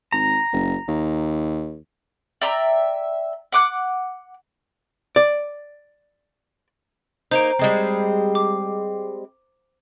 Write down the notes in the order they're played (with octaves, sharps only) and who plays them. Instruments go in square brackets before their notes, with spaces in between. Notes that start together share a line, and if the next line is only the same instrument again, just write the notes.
[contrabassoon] G#1 [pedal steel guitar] A#5
[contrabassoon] F#1
D#2
[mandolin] D5 E5 G5 A#5
F#5 D6 F#6
[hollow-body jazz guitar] D5
[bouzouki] A#3 D#4 [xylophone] C5 A#5 D7
[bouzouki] G3 G#3 C4
[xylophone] D6